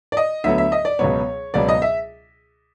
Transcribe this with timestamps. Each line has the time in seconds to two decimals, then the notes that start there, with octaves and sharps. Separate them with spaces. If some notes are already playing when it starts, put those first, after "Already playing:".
0.12 D5
0.17 D#5
0.44 D2 D3 F#3 B3 E5
0.58 E5
0.72 D#5
0.85 D5
0.99 C#2 B2 F#3 B3 C#5
1.54 C#2 B2 F#3 B3 D5
1.69 D#5
1.82 E5